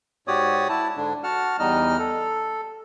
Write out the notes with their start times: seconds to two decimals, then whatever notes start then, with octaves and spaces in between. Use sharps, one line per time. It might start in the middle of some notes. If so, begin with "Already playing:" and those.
0.28 G#2 F#4 G4 C#5 D5 D#6
0.69 E4 A5
0.96 G#2 D3 D4
1.24 F#4 F#5 A5 F6
1.59 E2 G3 D#4 D#5 F6
1.99 A4